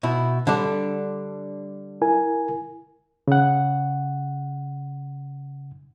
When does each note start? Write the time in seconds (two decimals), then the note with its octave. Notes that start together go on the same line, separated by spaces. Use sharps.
0.03 B2 E4
0.47 D3 G3 D4
2.01 E4 A#4 G#5
3.28 C#3 F#5